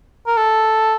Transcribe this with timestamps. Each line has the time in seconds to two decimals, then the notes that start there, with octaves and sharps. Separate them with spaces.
0.27 A#4
0.37 A4